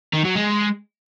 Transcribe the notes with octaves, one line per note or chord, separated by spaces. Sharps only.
D#3
F#3
G#3